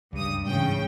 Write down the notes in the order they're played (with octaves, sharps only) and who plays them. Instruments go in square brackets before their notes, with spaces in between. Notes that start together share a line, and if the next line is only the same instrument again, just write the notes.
[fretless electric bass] C#2 [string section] G2 D#6
[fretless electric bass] G#2 E3 [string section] C#3 G5